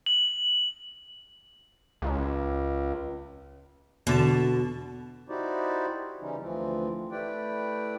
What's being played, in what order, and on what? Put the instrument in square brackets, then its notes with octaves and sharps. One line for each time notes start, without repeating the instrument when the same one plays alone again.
[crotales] F#7
[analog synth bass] C#2
[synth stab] E2 D3 A5 [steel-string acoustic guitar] B2
[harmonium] D#4 E4 F#4 G4 C5 D5
C#3 E3 G3 C#4 D#4
D2 E3 F3 C4
A3 E4 G4 B4 D5 G5